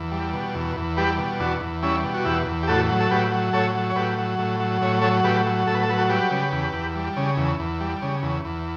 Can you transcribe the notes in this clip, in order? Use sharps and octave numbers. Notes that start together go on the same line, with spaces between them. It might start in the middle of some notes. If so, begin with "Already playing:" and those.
Already playing: E2
G3
B2
E2
E2
G3 G4 B4
B2
E2 D4 F#4
E2
G3 C#4 E4
B2
F#4
E2 E4 G4
E2
G4
A2 F#4 A4
F#3
A4
A2 G4 B4
F#3
A2 A4 C#5
F#3
C#5
A2 G4 B4
F#3
A2
F#3
A2 C#5
F#3 A4 C#5
A2 G4 B4
F#3
A2 A4
B4
A4
F#3 B4
F#4 A4
G3 G4 B4
C#3
E2
E2
G3
C#3
E2
E2
G3
C#3
E2
E2